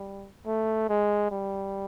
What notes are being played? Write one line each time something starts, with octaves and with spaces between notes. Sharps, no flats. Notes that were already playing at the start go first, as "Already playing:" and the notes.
Already playing: G3
A3
G#3
G3